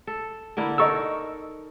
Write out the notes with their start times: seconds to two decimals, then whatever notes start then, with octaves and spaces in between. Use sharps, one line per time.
0.07 A4
0.57 D3 A#3 E4
0.78 D#4 A4 A#4 D#5 C#6 E6